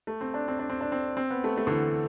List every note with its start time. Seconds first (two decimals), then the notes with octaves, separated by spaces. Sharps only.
0.07 A3
0.21 C4
0.34 D4
0.48 C4
0.59 D4
0.70 C4
0.81 D4
0.92 C4
1.17 C4
1.31 B3
1.44 A3
1.58 A3
1.67 D3
1.71 E3